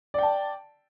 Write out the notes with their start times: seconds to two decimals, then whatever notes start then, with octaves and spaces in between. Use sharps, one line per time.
0.14 D5
0.18 G5
0.23 A5